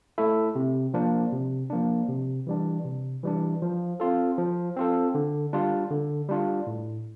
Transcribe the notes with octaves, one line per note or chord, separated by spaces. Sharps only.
A3 E4 A4 E5
C3
F3 A#3 D4
C3
F3 A#3 D4
C3
E3 G3 D4
C3
E3 G3 D4
F3
C4 F4 A4
F3
C4 F4 A4
D3
G3 D4 F4
D3
G3 D4 F4
A2